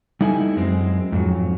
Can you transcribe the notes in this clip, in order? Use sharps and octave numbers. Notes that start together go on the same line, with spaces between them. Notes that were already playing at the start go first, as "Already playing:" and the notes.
G3 D#4 E4 A4 G5 G#5
F#2 G#3 C4
F2 G#2 F#3